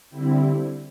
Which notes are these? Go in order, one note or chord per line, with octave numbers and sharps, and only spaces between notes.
D3 G3 C4 E4